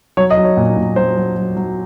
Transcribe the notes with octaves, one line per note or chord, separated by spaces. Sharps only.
F#3 C#5
D#5
F#3
C#5
A#2
A#2
F#3 C5
F#3
F#3
F#3